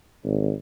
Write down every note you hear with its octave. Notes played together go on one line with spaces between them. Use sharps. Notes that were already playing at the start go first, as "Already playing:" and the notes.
G#1